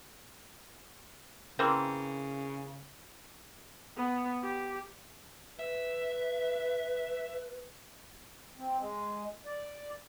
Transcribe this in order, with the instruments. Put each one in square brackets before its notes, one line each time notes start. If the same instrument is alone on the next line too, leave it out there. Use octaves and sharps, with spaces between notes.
[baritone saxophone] C#3 [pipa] E3 A#3 C4
[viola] B3
G4
[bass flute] B4 [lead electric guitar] E5
[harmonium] C4
G#3
D5